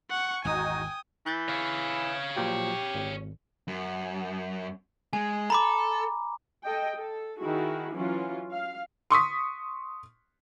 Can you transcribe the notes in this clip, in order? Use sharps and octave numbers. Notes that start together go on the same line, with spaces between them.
F#5 C#6
G#1 E2 D#4 F#4 G5 G#5 D#6
E3 F#6 G6 A6
C#5 F5
A#2 F3 F#3 G4
G#1
F#2
G#3 G#5
A4 A#5 B5 D6
A4 D#5 G5
A4
D#3 E4 F#4 G#4
E3 F#3 C#4 F4
F5
C6 C#6 D#6 B6